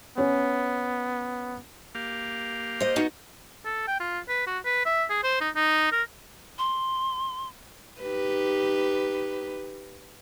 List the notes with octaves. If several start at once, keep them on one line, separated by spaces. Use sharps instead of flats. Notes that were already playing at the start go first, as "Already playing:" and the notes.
B3 C#4
A#3 G4 F5
C5 D#5
B3 D#4 F#4
A4
G5
F4
B4
F#4
B4
E5
G#4
C5
D#4
D#4
A#4
C6
D#4 G4 B4